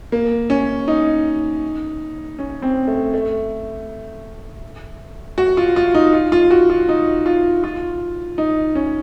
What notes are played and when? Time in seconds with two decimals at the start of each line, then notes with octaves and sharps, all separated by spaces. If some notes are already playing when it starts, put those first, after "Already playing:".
0.12 A#3
0.50 C#4
0.88 D#4
2.39 C#4
2.62 C4
2.88 A3
3.14 A3
5.38 F#4
5.57 F4
5.76 F4
5.94 D#4
6.13 F4
6.32 F4
6.51 F#4
6.70 F4
6.89 D#4
7.26 F4
7.64 F4
8.38 D#4
8.75 C#4